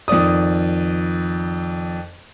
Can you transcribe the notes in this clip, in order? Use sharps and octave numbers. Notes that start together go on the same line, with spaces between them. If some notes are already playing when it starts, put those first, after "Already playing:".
F2 D#3 D5 D#6